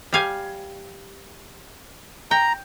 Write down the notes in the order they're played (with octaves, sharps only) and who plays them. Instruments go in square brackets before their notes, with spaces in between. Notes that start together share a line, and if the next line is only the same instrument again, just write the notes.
[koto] G3 F5 G#5
[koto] G5 [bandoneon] A#5